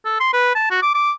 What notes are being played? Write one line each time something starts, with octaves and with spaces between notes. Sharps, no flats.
A4
C6
B4
A5
F#4
D6
D6